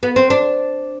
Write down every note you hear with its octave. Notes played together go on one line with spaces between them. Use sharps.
B3
C4
D4